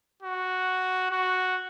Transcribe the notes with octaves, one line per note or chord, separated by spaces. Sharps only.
F#4
F#4